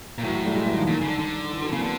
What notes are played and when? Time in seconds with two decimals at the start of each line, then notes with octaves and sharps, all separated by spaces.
0.18 A#2
0.23 A2 E3 F#3
0.34 E3 F#3
0.44 G3 A3
0.55 F#3 G#3
0.65 E3 F#3
0.76 D#3 F3
0.87 A#2 D#3
1.01 C#3
1.08 D3
1.19 D3
1.51 E3
1.61 E3 F#3
1.72 C#3 A#3 C4
1.82 D3 B3